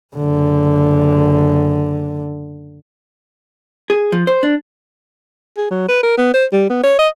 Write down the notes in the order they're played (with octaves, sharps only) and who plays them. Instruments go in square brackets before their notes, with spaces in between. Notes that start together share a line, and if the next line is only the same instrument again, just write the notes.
[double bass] F#1 D3
[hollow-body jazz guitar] G#4
F3
C5
D4
[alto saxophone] G#4
F#3
B4
A#4
B3
C5
G3
B3
C#5
D#5